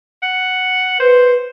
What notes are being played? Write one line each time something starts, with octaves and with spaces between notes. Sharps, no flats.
F#5
B4 C5